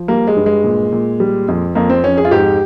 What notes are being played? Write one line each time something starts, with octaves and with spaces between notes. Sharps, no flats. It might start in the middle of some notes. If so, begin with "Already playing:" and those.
Already playing: F3
G3 A#3
G#3
G2
G#3
A#2
A#2
G3
F2
F2 A#3
C4
F2 C#4
G#4
F4
G#2 G4